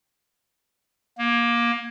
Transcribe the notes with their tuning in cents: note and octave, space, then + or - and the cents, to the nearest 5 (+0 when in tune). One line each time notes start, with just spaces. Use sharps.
A#3 +20